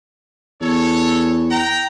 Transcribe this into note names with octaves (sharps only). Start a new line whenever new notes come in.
E2 A4 C#5
G5 A#5